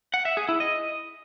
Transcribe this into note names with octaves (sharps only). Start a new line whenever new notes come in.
F#5
E5
G#4
E4
D#5